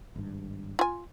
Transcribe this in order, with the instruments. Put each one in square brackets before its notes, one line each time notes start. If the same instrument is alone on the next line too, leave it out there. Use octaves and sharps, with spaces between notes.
[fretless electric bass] G#1 G2
[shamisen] F4 G#5